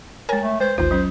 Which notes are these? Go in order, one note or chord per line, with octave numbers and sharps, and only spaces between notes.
G#3 A#4 C#5 G#5 A#5
A3
G#3 B4 C5
A1 D#2 F4 C5
F#3 C#4